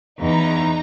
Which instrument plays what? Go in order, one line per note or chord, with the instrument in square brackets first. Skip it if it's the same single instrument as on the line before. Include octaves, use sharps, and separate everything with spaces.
[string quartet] E2 [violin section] D#4 A#5